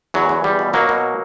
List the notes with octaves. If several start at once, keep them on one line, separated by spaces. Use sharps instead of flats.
E2 F#3
E2
E2 G3
B2
B2 F#3 A#3
B2